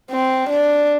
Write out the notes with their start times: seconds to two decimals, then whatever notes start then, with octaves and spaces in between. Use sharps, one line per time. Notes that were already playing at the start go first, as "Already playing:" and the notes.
0.11 C4
0.49 D4